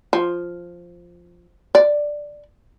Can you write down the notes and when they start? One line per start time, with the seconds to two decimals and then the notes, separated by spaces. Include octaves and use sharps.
0.13 F3
1.75 D5